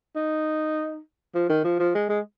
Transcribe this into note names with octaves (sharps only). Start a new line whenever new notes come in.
D#4
F3
D#3
F3
F3
G#3
G#3